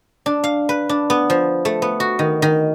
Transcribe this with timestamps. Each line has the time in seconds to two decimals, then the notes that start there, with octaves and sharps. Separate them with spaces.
0.26 D4
0.44 F5
0.69 B4
0.89 D4
1.10 B3
1.30 F3
1.65 A3
1.82 B3
2.00 F#4
2.19 D#3
2.42 D#3